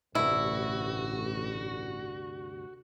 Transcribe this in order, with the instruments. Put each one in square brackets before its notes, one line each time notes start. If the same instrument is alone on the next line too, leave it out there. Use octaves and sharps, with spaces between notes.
[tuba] A1 [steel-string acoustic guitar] D2 G2 C3 [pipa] E4 [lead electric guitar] F#4